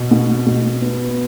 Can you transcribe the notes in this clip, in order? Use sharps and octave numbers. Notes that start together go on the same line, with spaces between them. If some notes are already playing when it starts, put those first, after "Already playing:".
Already playing: B2
B2
B2
B3